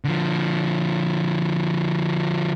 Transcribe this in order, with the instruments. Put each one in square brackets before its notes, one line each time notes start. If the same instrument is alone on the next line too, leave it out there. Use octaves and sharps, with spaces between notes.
[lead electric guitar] D3 F3